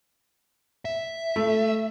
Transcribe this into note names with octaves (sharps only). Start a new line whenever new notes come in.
E5
A3